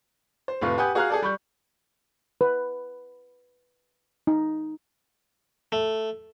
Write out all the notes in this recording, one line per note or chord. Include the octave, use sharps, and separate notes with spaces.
C5
F1 F2 A2 B4 F5 C#6
G4 B4 F#5 G#5 D#6 G6
F#4 G#4 F5 A#5 F6 F#6
G#4 A4 D5
G3 B5 C#6 G6
B4
D#4
A3